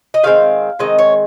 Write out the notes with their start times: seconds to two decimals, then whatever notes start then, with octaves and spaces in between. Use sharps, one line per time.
0.14 D#5
0.23 D#3 G#3 C4 F5
0.79 D#3 G#3 C4 D#5
0.99 C#5